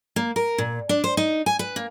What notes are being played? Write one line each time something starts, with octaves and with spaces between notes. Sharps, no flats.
A#3
A#4
A#2
D4
C5
D#4
G#5
B4
A#3